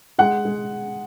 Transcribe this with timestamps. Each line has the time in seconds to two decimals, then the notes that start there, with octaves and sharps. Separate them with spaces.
0.19 G#3 F#5
0.45 G#3